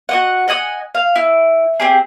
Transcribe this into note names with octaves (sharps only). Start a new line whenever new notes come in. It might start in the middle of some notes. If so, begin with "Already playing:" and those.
F#4 D#5 F#5
D#5 F#5 G#5 D#6
F5
E4
C4 G4 G#4